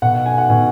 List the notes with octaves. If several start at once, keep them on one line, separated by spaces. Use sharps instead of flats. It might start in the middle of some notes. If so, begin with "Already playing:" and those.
B2 F#5
F#5
G#5
F#5
B2 G#5